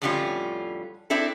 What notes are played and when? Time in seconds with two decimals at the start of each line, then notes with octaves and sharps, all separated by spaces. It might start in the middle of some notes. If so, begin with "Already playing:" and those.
0.02 F2 A2 D3 G3 C#4 F4
1.10 C4 D4 E4 A4